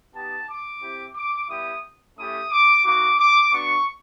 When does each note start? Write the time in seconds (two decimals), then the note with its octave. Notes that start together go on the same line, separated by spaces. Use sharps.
0.14 B3 D#4 G4 A5
0.48 D6
0.81 C4 E4 G4
1.15 D6
1.49 G3 B3 E4 G4 D#6
2.17 A3 C#4 E4 G4 D#6
2.50 D6
2.84 A#3 D#4 F#4 D6
3.19 D6
3.53 B3 D4 F#4 C#6